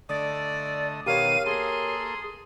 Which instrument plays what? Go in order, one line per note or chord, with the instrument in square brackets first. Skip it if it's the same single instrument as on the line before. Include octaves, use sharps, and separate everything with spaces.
[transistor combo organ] D3 A3 D#5 [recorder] D5
[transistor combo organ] B2 D#3 [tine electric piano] G4 A#4 C#5 [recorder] F5 [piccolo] D#7
[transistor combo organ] A#3 A4 [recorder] G#4 [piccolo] C6